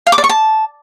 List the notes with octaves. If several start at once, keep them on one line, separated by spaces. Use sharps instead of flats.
F5
D6
D5
C#6
A5